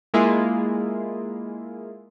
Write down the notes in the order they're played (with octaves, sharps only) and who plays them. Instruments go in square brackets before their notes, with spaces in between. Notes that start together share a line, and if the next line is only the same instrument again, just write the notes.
[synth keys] G#3 A#3 E4 F4 G#4